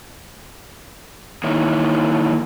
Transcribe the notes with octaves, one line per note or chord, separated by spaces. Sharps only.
D#3 E3 A#3 D#4 E4 C#5